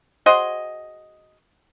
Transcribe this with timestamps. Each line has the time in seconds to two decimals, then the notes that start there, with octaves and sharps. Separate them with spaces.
0.26 F#4 G#4 C5 D#5